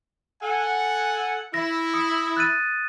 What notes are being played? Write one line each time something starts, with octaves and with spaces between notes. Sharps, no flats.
A4 F#5 G#5
E4 A#6
D#6 C#7
F#6 A6 D#7